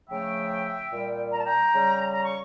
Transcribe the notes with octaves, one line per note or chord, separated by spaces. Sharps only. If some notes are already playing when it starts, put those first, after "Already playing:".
C#3 F3 A3 E5 G5
A#2 G3
A#5
A5
G5 A#5
C#3 G3
A#5
C#6